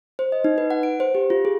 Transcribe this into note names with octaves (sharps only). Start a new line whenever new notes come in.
C5
D#5
D#4
B4
F#5
D7
C5
G4
F4
G#4